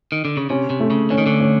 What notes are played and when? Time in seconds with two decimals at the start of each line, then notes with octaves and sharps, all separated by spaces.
0.12 D#3
0.25 D3
0.37 C#3
0.50 C3 C#4
0.70 C3
0.80 A3
0.90 C#3
1.10 D3 C#4
1.18 D#3
1.26 D2 D3
1.40 C#4